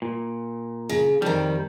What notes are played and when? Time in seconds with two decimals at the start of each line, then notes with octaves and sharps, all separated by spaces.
0.02 A#2
0.89 C#3
1.22 F2 D#3 G3